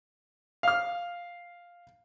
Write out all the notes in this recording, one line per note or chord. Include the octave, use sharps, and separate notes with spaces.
F5 F6